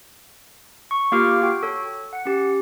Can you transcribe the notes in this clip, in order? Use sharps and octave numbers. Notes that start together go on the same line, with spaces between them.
C#6
A#3 F4 G4 F5 D6 F6
F#4 G5
A4 C#5
F#5 C#7
C#4 G4